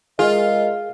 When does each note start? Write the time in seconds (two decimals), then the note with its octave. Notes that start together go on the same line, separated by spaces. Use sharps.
0.19 G#3 F4 G#4 A#4 D#5